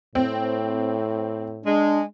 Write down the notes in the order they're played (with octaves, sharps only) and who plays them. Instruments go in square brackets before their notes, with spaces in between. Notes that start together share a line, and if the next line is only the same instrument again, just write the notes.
[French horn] A2 [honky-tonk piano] C4
[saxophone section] G#3 [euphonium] D4